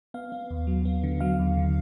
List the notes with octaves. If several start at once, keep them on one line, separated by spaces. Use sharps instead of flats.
B3 F5
B3
D#2
F#3
B3
D3
F#3 F5
D#2
D3